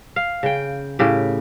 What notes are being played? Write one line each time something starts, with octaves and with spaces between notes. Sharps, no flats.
F5
C#3 G5
A2 C#3 G4